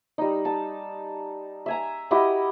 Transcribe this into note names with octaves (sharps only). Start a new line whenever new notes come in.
G3 D#4
A5
E5 G#5 A#5
E4 F#4 G4 D#5